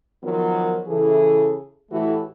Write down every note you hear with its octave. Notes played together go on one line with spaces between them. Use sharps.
D#3 F3 F#3 B3 F4 A#4
C#3 E3 E4 G#4 A4
A2 E3 A3 E4 F#4 G4